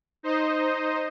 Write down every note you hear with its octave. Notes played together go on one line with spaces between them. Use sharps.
D#4 C5 D#5